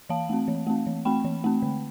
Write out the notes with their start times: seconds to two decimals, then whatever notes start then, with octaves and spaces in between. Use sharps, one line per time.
0.09 E3 F5 A5
0.29 A3 C4
0.48 E3
0.67 A3 C4
0.87 E3
1.05 A3 C4 G5 B5
1.25 E3
1.44 A3 C4
1.62 D3